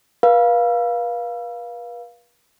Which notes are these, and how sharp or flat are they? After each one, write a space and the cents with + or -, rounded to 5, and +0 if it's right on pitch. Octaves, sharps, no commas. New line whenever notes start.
B4 -40 F5 +0